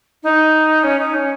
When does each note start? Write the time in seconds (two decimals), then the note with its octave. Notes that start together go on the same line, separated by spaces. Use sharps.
0.23 D#4
0.83 C#4
0.99 D#4
1.14 C#4